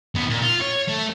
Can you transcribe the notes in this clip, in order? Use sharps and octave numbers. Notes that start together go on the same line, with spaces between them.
D#2 B3
A#2
F4
C#5
A3